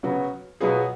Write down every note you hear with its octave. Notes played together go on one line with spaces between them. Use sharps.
C#3 F#3 B3 F#4
B2 F#3 B3 F4 G#4